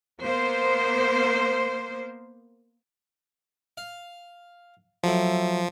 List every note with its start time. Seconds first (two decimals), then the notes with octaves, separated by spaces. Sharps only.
0.22 A#3 B3 C5
3.77 F5
5.04 F3 F#3 A3 E4